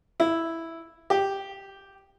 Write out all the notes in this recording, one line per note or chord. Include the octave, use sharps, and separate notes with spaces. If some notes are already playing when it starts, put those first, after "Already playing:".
E4
G4